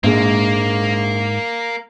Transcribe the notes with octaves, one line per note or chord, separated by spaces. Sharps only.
A#1 G#2 G#3 A#3